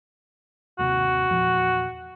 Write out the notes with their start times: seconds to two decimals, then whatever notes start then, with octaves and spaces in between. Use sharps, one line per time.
0.79 G1 D#2 C3 F#4
1.29 E2 A#2 F3